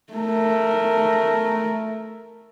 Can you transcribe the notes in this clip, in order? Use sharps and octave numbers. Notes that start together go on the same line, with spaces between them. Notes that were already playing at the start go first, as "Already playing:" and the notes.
A3 A#4